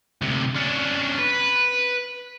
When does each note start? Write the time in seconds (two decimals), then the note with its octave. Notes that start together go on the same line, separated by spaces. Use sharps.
0.22 D2 C3
0.55 C#4 D4
1.18 B4